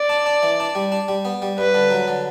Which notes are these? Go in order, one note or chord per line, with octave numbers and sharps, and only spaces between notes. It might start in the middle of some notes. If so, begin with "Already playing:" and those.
Already playing: D5
D4
D4
E3
D4
G3
D4
G3
B3
G3
G2 B4
D3
F#3
D3